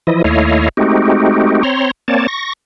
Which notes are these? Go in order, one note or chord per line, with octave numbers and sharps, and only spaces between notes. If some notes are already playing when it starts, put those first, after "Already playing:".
E3 F3 E4 D#5
D#2 A3 E4 C#5 D#5 F5
G#3 A3 C4 D#4 F#4 G4
C4 C#5 A#5 C6
A#3 C4 C#5 D5 A5
C#6 A#6